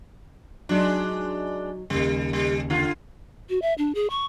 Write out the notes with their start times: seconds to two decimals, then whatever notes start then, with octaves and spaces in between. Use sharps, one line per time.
0.69 F#3 G#3 D4 D#4
1.90 D#2 C#3 G3
2.33 G3
2.70 D3 F4
3.50 F#4
3.62 E5
3.78 D4
3.95 G#4
4.10 C#6